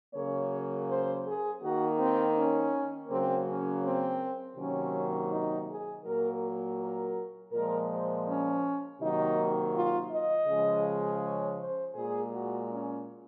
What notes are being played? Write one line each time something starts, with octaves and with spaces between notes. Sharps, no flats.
C#3 F#3 A#3 C#5
C5
G#4
D#3 A#3 F#4
C4
C#4
C#3 F#3 A#3 C4
C#4
C4
C3 D#3 F#3 A#3 C#4
D#4
G#4
A#2 F#3 A#3 A#4
A#4
A#2 F3 G#3 A#4
C5
C#4
C3 D#3 F#3 A#3 D#4
F4
D#5
C#3 F3 G#3
C#5
C5
A#2 G#3 G#4
F#4
C#4